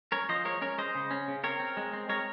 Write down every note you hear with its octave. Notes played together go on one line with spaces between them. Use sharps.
C#4 A#4 C#5
F3 C5 D#5
G#3 A#4 C#5
C#4 A#4 C#5
G#3 C5 D#5
C#3
C#4
C#3
C4 A#4 C#5
C4
G#3
C4
G#3 A#4 C#5